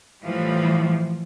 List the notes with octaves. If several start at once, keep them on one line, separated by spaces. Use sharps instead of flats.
A2 E3 F3 G3